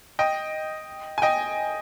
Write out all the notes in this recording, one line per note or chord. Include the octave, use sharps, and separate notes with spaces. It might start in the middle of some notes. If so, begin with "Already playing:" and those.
D#5 G5
G#5
D#5 G5